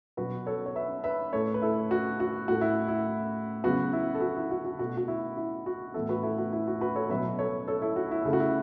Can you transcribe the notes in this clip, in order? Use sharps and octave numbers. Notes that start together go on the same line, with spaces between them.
B2 F#3 B3 F#4 B4
A4 C#5
C#5
B4 E5
B4 E5
A2 A3 A4 C#5
B4
E4 A4
F#4
F#4
A2 A3 F#4
E4
E4
C#3 F#3 B3 F#4
E4
A4
F#4
E4
F#4
F#4
B2 A3 F#4
F#4
E4
E4
F#4
A2 E3 B3 E4 A4
F#4 B4
E4 A4
F#4
E4
F#4
F#4 B4
A4 C#5
B2 F#3 B3 B4 E5
A4 C#5
A4 C#5
E4 A4
F#4
E4
C#3 A3 E4
F#4
E4